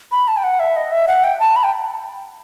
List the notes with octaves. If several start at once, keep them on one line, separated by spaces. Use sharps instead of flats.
B5
A5
G5
F#5
E5
D#5
E5
F#5
G5
A5
B5
G5